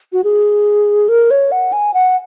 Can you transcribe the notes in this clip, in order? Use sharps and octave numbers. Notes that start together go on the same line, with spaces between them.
F#4
G#4
A#4
C#5
F#5
G#5
F#5